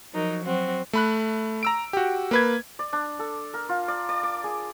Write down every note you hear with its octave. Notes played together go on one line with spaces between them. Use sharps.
F3 F#3 D#4 A#4
F#3 C4 F#4
A3 B5 F#6
A#5 E6 D7
F#4 G4
A#3 B4 G#6
D5
D4
A4
A#4
F4
D5
D5
D6
G#4